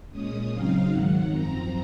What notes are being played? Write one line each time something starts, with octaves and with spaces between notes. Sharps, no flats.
A#2 G#3 C#4 D#6
C#3 F#3 C4 D#4 F5
G#2 D#3 F#3 F#5
F#2 F3 C4 A#5